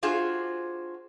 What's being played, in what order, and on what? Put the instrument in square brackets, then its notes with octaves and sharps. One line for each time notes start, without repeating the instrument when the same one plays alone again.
[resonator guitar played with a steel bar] D4 F4 F#4 G#4 C5